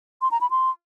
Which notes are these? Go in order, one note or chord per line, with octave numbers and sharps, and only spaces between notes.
C6
A#5
B5
C6